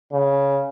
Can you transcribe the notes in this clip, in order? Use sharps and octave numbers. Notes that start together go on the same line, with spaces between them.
C#3